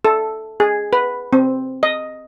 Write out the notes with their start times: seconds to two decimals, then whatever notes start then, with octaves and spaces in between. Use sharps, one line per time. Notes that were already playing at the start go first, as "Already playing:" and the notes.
0.05 A4
0.60 G#4
0.93 B4
1.33 C4
1.83 D#5